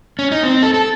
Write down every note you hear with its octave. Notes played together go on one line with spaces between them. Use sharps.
C#4
D#4
C4
A4
A4